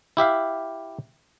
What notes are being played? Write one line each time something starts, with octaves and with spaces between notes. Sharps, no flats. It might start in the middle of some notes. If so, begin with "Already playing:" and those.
E4 G4 E5 F5